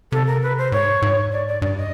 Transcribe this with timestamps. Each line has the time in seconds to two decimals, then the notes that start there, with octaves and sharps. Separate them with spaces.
0.12 C3 A4
0.27 A#4
0.43 B4
0.58 C5
0.72 G#2 C#5
1.02 G#2
1.32 D5
1.47 D5
1.62 G2 D5
1.77 D#5